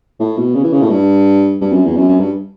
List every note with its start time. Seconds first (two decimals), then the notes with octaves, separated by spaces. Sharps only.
0.20 A2
0.37 B2
0.55 C#3
0.64 E3
0.73 C#3
0.82 A2
0.90 G2
1.61 G2
1.72 F#2
1.85 E2
1.96 F#2
2.08 F#2
2.20 G2